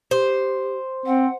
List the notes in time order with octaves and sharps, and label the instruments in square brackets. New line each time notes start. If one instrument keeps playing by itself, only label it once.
[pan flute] G4 [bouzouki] C5
[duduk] C4 [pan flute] F#5